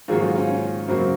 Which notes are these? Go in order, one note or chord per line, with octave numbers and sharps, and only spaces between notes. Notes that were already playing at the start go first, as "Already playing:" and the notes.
G#2 D#3 F#3 A#3 F4 G#4
C#4 F4
C#4 F4
C#4
F#2 C#3 F#3 A#3 C4